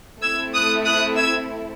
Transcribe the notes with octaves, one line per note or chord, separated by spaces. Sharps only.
A3 C4 E4 E6 G#6
D#6 F#6
D#6 F#6
E6 G#6